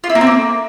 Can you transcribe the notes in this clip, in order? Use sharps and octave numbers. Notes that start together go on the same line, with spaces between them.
F4
E4
A#3
C4
A#3